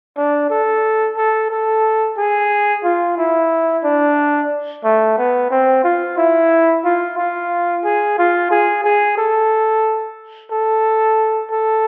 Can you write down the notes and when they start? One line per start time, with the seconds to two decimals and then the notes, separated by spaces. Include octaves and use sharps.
0.17 D4
0.50 A4
1.17 A4
1.51 A4
2.18 G#4
2.84 F4
3.18 E4
3.84 D4
4.84 A3
5.18 B3
5.51 C4
5.84 F4
6.17 E4
6.84 F4
7.18 F4
7.85 G#4
8.18 F4
8.51 G#4
8.84 G#4
9.18 A4
10.51 A4
11.51 A4